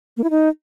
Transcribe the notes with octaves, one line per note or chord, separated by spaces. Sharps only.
A#3
E4
D#4